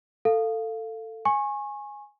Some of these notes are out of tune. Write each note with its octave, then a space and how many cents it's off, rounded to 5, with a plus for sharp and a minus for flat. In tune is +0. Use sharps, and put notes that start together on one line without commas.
A4 +15 F5 +0
G#5 +0 C#6 -30